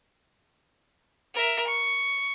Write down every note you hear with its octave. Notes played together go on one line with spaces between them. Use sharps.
A#4 E5
C#6